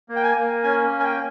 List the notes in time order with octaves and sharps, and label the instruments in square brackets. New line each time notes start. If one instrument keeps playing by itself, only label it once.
[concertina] A#3
G5
G#5
A#3
C#4 G#5
A#3
G#5
G5